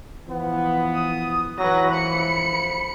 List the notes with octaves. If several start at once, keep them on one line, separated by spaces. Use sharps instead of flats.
E3 F3 B3
D#6
E3 F#3 B4 A#6
F3 B5 C#7